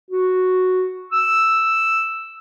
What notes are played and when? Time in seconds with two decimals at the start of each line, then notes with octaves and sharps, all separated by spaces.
0.11 F#4
1.12 E6